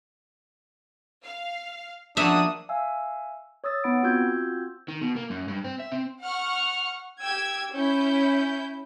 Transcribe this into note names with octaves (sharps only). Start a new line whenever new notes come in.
F5
F3 A#3 D4 F#4 E5 D#6
E5 F5 G#5 E6
C#5 D#6 E6 A6
B3 D#4 F#5 B5 A6 D7
C4 F4 F#4 E6 G6 G#6
D#3
B2
A#3
F#2
G2
C4
E5
C4
F#5 C#6 F6
G4 G5 E6 G#6
C#4 E4 G6